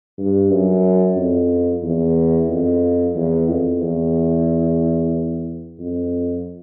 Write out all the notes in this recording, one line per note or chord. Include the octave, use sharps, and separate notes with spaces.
G2
F#2
F2
E2
F2
E2
F2
E2
F2